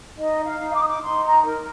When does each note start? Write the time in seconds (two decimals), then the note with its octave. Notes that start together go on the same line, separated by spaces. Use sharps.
0.18 D#4 D#5
0.45 F5
0.60 D#4
0.75 D6
0.81 D#6
0.88 D6
1.03 D#4 C6
1.24 A#5
1.45 A#4